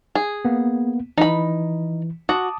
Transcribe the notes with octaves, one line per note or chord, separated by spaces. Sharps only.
G#4
A#3 B3
E3 D#4 B5
F#4 A5 D6 D#6